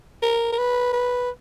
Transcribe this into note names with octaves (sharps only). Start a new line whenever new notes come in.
A#4
A#4
B4
B4